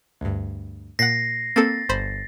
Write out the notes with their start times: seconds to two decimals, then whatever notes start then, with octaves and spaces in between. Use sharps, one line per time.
0.21 D2 G2
0.99 A#2 F#5 A#6 C7
1.56 A#3 C4 A4 A6
1.89 G1 C5 B5